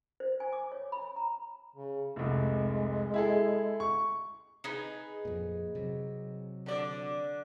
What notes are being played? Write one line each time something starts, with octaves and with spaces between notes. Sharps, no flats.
C5
G#5
D6
C#5
B5
A#5
C#3
F1 C2 G#3
E4 G#4 A4
C#6
D#4 G#4 B4
F2 A#2
C3 F#3
D3 D5